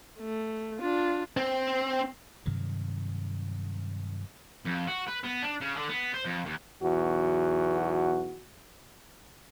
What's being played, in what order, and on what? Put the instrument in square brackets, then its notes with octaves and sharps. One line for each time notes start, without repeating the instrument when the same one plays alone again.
[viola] A3
D4 F4
[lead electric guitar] C4
[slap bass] G2 C3 D#3 F#3
[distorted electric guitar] F2
F#4
B4
B3
D4
C#3
D3
B3
C5
F2
D#2
[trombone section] B1 E2 F#4